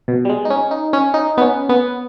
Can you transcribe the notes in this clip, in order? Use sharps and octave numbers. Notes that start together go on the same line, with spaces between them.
B2
G3
G#3
D#4
C#4
D#4
C#4
D#4
B3
C#4
B3